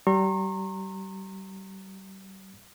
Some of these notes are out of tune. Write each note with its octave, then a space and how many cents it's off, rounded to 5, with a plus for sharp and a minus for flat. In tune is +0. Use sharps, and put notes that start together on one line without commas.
G3 -35 A#5 -20 C#6 -45